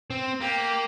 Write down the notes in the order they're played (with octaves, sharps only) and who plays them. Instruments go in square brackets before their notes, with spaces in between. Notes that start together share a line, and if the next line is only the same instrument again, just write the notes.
[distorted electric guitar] C4
[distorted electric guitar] A#3 [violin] G4